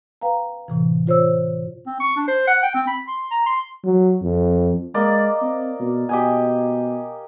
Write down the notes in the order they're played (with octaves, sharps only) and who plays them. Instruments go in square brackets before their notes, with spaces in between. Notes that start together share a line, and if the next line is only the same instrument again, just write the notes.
[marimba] B4 F5 G5 A#5
A2 C3 E3
F4 C5 C#5 E6
[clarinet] C4
C#6
D4
C5
F#5
G5
C4
B5
C6
A#5
C6
[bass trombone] F#3
F2
[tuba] G#3 [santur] A#3 D5 D#5
[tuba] C4
B2
[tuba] B2 [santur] G4 D#5 G#5